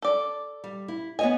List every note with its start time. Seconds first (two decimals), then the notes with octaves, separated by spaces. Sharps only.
0.02 A4 D5
0.64 G3
0.88 E4
1.19 B3 C#5 D#5 G#5